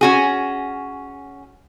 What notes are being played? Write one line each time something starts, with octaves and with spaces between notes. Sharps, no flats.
C#4 F#4 G#4